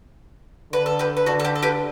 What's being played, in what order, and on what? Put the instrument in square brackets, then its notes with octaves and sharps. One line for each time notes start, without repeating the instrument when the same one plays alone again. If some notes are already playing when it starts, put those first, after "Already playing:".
[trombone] D3 [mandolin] B4
[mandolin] A4
G4 B4
B4
[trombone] D3 [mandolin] F#4 A4
[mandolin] A4
G4
A4
G4 B4